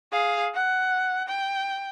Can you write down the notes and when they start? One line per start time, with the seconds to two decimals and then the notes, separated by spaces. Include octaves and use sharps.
0.12 G#4 F5
0.55 F#5
1.28 G5